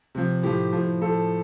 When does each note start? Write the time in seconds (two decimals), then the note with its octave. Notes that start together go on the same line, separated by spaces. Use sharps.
0.15 C3 F3
0.43 A2 F3 G4
0.73 A2 F3
1.01 A2 F3 A4